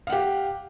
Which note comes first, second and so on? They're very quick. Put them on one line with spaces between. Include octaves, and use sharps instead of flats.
F5 F#5 G4